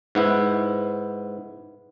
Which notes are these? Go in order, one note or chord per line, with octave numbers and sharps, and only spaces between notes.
G#2 B3 E4